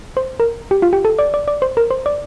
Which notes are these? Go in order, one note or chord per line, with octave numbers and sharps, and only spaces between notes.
C5
A#4
G4
F4
G4
A4
D5
D5
D5
C5
A#4
C5
D5